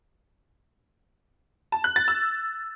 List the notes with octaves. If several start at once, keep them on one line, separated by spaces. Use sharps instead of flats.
A5
F#6
A6
E6